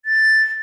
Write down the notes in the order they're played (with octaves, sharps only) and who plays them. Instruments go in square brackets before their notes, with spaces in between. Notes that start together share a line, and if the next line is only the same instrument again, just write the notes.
[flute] A6